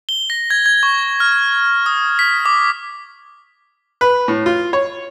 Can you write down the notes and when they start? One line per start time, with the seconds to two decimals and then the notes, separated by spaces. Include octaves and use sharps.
0.09 G7
0.30 A#6
0.50 G#6
0.66 G#6
0.83 C#6
1.20 F6
1.86 D#6
2.19 B6
2.46 D6
4.01 B4
4.28 A2
4.46 F4
4.73 C#5